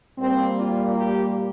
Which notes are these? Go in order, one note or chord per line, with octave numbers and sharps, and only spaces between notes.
A#2 G3 A#3 C4
F4
G4